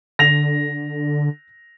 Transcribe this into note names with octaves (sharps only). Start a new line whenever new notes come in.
D3 A#6 F7